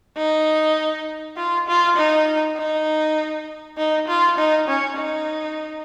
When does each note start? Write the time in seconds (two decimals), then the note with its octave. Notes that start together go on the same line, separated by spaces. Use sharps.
0.17 D#4
1.37 F4
1.68 F4
1.97 D#4
2.57 D#4
3.77 D#4
4.08 F4
4.38 D#4
4.68 C#4
4.97 D#4